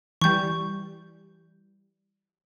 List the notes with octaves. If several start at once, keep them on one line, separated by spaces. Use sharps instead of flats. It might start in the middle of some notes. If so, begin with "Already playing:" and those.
E3 G3 C#6 G6